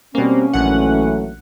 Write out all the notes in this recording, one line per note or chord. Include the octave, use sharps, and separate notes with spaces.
B2 G3 A#3 C4 C#4
A#1 E3 F#3 A3 F#5